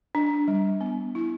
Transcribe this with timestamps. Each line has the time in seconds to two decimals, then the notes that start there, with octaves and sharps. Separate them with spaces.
0.15 D4
0.48 G3
0.81 B3
1.15 E4